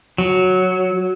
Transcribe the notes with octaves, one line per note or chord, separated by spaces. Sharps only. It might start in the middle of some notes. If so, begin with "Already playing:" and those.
F#3